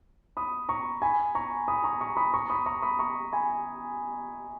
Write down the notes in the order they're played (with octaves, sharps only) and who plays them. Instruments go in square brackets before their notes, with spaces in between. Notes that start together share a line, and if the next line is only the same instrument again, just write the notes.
[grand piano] B5 D#6
A#5 C#6
G#5 B5
A#5 C#6
B5 D#6
A#5 C#6
A#5 C#6
B5 D#6
A#5 C#6
B5 D#6
A#5 C#6
B5 D#6
A#5 C#6
G#5 B5